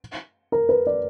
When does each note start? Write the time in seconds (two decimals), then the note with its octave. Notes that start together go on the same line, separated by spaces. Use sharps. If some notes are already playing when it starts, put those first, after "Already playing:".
0.52 A#4
0.69 B4
0.87 D5